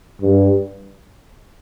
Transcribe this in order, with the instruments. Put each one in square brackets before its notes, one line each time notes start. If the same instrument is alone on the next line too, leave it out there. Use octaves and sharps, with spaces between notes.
[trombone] G2